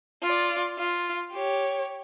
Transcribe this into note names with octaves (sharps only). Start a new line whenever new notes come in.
F4 D5
F4
G4 C#5